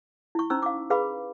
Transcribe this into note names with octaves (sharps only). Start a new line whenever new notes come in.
E4 C#6
C#4 D#4 C5 A#5 C#6 E6
F5 D6
G#4 B4 F5 B5 D6